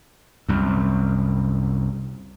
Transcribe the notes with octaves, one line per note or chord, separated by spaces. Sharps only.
C2 F#2